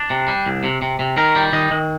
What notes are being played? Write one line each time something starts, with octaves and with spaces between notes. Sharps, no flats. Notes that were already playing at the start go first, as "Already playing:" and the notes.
Already playing: D4
C3
G3
C2
C3
C3
C3
D#3 A#4
G3
D#3 D#5
D#3